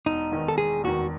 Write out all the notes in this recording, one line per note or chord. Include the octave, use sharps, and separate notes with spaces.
E1 D#4
E2 D#3
A4
E1 G#4
E2 D#3 F#4